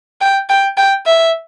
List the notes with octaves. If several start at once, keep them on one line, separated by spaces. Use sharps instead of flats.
G5
G5
G5
E5